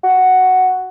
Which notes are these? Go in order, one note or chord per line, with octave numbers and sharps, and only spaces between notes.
F#4